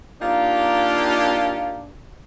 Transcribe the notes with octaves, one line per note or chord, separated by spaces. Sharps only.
A#3 D4 D#4 F4 G4